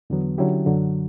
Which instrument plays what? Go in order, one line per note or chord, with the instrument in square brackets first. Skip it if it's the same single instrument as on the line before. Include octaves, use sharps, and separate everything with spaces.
[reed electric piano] E2 D3 F#3 B3
D3 F#3 C#4 E4 G4
F#2 D3 F#3